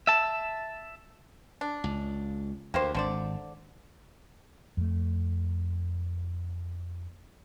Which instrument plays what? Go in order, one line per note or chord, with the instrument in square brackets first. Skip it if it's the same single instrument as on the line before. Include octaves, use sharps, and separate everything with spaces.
[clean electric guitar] E5 A5
[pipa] D4
[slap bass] C#2
[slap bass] D2 [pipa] A#3 G4 C5
[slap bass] G#1 [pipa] D3 C5 D5
[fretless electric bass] F2 A3